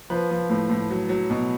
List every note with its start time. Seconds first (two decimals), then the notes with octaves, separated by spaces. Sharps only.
0.10 F3 B4
0.31 F3
0.50 A2
0.69 A2
0.90 F#3
1.09 F#3
1.30 B2